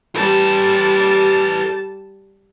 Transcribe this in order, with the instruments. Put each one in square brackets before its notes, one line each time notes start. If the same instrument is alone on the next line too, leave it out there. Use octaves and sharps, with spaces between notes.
[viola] G3 A5 [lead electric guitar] A4 B4